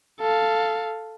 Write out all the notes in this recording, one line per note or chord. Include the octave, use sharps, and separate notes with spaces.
A4 F5